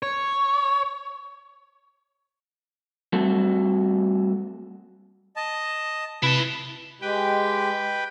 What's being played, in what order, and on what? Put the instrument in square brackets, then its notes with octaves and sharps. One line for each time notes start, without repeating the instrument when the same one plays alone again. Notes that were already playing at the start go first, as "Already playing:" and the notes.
[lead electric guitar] C#5
[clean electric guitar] G3 A3 C4 F#4 A4
[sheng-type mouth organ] D#5 A5
[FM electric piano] C3 [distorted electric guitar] E4 A5 [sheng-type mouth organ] B4
[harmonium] G#3 G4 [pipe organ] B4 G5